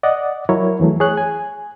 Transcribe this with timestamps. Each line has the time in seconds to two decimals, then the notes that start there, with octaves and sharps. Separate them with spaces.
0.03 D5 D#5 F#5
0.49 F#3 E4 A#4 C#5
0.80 E2 E3 F#3 A3
1.00 G#4 C#5 F#6
1.17 G#5